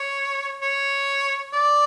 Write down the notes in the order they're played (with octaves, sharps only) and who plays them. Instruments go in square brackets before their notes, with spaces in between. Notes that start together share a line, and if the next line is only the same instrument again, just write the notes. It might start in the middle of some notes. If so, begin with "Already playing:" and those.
Already playing: [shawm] C#5
C#5
D5